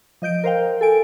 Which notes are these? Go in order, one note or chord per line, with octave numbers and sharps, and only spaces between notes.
F3 D#5 G6 D7
A#4 C5 F5 G5
A4 G#5 D7